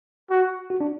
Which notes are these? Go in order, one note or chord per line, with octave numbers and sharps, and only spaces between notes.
F#4
F#4
D4